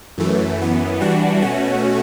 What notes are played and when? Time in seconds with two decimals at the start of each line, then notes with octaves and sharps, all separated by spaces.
0.18 F#2 E3 A3
0.59 F#2 E3 B3
1.00 E3 G3 D4 F#4
1.41 B2 A3 C#4 F#4